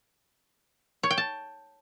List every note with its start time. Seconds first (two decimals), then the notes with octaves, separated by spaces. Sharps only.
1.03 C#5
1.10 G5
1.18 A5